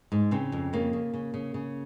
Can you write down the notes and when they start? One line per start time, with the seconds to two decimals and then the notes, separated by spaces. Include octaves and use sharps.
0.12 G#2
0.31 C#3 C4
0.52 F2
0.73 C#3 A#3
0.93 C#3
1.14 C#3
1.34 C#3
1.54 C#3